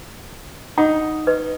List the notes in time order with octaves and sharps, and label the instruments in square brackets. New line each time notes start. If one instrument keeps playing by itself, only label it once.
[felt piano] D#4 [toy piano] F#5
[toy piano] B4 D#5